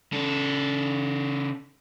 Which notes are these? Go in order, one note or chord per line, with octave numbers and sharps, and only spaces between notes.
C#3 A4